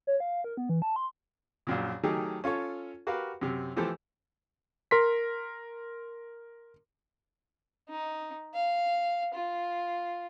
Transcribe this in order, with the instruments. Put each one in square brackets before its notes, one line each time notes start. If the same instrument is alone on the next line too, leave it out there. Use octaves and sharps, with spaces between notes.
[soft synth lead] C#5
F5
A#4
B3
E3
A5
C6
[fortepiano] A#1 F#2 A#2
D#3 F#3 A3 D#4 G4 G#4
C#4 F4 A4 C#5
F#4 G4 A#4 B4 F5
F#2 C3
E3 F3 A3 G4 A4 C5
[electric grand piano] A#4 C6 B6
[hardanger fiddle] D#4
F5
F4